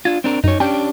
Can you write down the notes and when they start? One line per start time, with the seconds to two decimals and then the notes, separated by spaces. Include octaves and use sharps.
0.05 D4 F4 G#6
0.24 C4 D4 A#4
0.44 F#2 D#4 C#5
0.60 C#4 D4 G4 G5